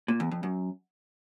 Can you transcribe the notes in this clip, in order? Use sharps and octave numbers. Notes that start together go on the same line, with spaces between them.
A#2
E2
F2
F#2